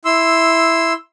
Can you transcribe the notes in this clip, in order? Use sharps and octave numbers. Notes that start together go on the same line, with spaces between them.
E4 C6 E6